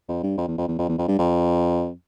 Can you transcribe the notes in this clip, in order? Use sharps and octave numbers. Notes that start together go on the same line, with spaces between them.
F2
G2
F2
E2
F2
E2
F2
E2
F2
G2
F2